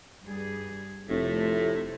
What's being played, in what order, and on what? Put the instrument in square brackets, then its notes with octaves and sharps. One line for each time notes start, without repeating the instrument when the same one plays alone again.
[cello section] G2 G3 G#4
[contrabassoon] F1 [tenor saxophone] A2 [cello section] C3 A3